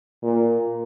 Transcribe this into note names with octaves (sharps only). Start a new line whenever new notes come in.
A#2